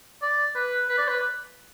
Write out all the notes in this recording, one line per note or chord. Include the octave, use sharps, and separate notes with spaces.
D5
B4
B4
D5
B4